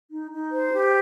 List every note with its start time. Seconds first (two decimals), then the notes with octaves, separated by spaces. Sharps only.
0.11 D#4
0.31 D#4
0.52 C5
0.72 G4